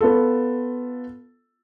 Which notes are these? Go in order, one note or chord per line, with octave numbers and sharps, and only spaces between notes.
B3 F4 A4